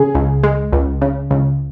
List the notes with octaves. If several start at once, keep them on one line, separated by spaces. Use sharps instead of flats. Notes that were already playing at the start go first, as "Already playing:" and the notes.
Already playing: C#3 G#4
C#2
G#3
C#2
C#3
C#2